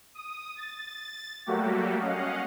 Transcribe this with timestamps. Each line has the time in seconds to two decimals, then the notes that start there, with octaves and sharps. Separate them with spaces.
0.15 D#6
0.56 A6
1.46 F#3 G3 A3 A#3 F#4 G4
2.00 C#4 D#5 F5 F#5